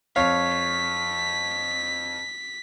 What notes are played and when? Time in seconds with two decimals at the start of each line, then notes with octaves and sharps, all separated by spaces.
0.16 F2 C#5 F5 B6